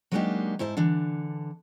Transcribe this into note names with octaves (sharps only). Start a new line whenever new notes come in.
F#3 G#3 A#3 D4 D#4 G4
G#2 E4 C5 A5
D3 E3 D4